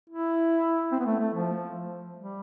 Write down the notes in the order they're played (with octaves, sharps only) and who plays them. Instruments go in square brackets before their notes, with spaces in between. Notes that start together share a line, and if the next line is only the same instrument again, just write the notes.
[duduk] E4
C4
B3
A3
A3
F3
G3